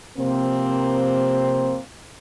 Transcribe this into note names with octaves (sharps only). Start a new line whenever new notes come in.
C3 F3 A#3 C4